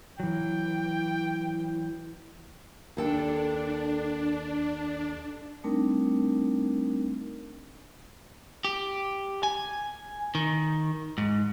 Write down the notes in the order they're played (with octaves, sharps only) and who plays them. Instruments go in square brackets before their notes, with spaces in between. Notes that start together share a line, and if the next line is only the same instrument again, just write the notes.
[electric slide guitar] E3 F#3 [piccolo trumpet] G5
[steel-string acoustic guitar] D#2 A4 G5 [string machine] D4
[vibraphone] G3 A3 C4 D4 D#4 A#4
[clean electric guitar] G4
G#5
D#3
G#2